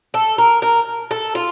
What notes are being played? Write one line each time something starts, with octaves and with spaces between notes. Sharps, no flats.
A4
A#4
A#4
A4
F4